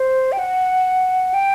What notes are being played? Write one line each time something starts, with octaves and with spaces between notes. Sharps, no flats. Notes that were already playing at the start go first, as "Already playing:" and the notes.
Already playing: C5
G5
F#5
G5